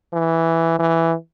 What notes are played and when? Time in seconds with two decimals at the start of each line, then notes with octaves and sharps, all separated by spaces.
0.13 E3
0.79 E3